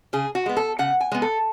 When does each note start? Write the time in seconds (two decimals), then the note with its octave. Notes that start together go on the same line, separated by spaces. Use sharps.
0.13 C#3 G#4
0.35 F#4
0.46 G#3 B3
0.57 A4
0.79 C#3 F#5
1.01 G#5
1.12 G#3 B3
1.22 A4